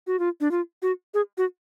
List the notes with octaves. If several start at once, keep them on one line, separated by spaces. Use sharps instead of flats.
F#4
F4
D4
F4
F#4
G#4
F#4